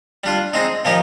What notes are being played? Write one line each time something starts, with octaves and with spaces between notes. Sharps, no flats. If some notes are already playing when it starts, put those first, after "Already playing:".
G3 D4 F4
G#3 C4 D#4
A#2 F3 A#3 D#4 G4